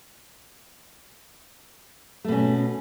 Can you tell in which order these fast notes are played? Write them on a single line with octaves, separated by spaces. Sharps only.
A3 B2 C#4